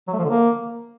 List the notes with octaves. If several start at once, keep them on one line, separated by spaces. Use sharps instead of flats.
F#3
A3
F3
D3
A#3